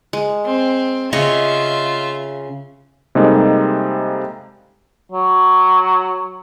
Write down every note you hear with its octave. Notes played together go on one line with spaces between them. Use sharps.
G#3
C4
C#3 F4 C#5 D#5 E5
C3 G3 G#3 A#3 D#4 A4
F#3